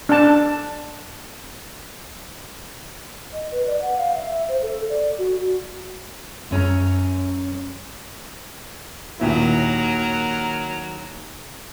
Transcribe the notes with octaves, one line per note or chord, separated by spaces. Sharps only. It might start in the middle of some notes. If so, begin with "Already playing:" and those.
D4 A5
D#5
B4
D5
F#5
F5
E5
E5
C5
A4
D5
F#4
F#2 C#4 C#5 A#5
D#2 A#2 F#3 E4 A#4